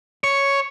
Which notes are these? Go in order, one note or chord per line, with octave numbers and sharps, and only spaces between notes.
C#5